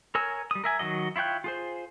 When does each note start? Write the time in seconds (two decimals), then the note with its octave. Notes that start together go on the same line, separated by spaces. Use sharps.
0.15 A#4 C#5 G#5 E6
0.51 G3 D#6
0.64 A#4 E5 G#5
0.79 D#3 F#3 F#4 D#5
1.16 E4 F4 C#5 G5 F#6
1.44 F4 G#4 C5